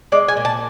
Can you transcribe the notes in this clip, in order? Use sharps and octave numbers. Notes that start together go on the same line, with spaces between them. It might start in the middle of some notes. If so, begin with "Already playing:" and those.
G#3 D5
G#5
A#2
A5